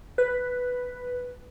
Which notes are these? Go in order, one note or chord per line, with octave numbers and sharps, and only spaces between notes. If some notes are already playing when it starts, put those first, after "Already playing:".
B4